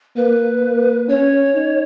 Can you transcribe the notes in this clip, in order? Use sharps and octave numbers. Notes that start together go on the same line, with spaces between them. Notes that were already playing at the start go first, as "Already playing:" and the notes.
A#3 B4
A#3
C#4 C#5
D#4